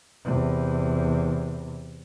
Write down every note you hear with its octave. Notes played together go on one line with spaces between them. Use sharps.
E2 C3